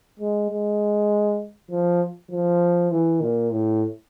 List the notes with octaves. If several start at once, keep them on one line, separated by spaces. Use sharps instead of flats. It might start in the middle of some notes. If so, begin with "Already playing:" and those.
G#3
G#3
F3
F3
E3
A#2
A2